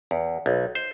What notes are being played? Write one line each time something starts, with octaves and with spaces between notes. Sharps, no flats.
E2
B1
C5